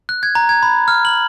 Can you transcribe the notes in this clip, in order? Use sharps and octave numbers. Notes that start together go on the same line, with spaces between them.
F#6
G#6
A#5
G#6
B5
F6
F#7